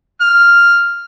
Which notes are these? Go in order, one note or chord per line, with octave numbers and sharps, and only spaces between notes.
F6